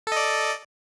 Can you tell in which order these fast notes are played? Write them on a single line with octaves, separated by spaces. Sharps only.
A4 D#5 D5